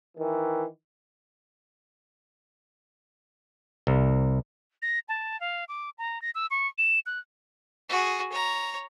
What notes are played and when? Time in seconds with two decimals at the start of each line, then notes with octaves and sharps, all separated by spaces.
0.18 D#3 E3
3.87 C2
4.82 A#6
5.09 A5
5.40 F5
5.68 D6
5.98 A#5
6.22 A#6
6.35 E6
6.51 C#6
6.78 E7
7.06 F#6
7.89 F#4 G#4
8.32 C#5 A#5